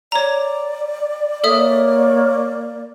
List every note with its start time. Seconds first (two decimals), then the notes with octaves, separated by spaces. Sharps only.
0.12 C#5 D5 A#5
1.44 A#3 A4 C#5 E5 D#6